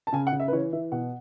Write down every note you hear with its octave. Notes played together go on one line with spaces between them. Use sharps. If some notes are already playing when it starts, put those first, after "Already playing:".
A5
C#3 G#5
F#5
C#3
E5
B4
E3 C#5
E3 E5
B2 F#5